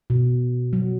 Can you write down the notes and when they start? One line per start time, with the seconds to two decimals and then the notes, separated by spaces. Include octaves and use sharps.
0.10 B2
0.73 F#3